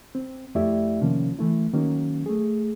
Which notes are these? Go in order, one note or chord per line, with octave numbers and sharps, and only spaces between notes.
C4
F2 A3 E4 G4 D5 E5
C3 D#3 F3 A#3 C#4
E3 A3 E4
D#3 F#3 A#3 C#4
A3 G#4